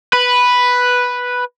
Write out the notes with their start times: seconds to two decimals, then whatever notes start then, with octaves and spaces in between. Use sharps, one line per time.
0.13 B4